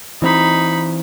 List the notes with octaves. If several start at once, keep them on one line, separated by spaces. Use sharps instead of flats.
E3 C4 D#4 B5